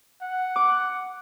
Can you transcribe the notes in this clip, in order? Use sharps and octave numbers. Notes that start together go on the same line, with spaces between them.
F#5
D6